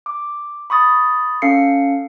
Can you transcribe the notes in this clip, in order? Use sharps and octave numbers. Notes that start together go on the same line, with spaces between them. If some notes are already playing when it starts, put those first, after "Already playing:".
D6
B5 C#6 D#6 A6
C#4 A4 F5 C7 C#7